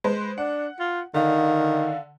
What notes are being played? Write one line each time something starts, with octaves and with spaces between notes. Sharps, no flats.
G#3 B4 C5
D4 F#5
F4
D3 D#3 F5